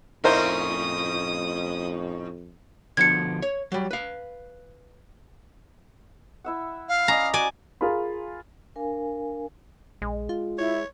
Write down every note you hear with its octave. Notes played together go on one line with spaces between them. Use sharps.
F2 A2 C#4 D#4 E4 A#4 C5 D#6
B2 D3 F3 G#6 C#7
C#5
F#3 G3
B4 F5
E4 E5 F#5
F5
C#4 D5 D#5 A#5
F#4 D5 G#5
F4 G#4 A#4 F5 B5
D4 A#4 F5 G#5
A#1 G#3
F4
E4 C#5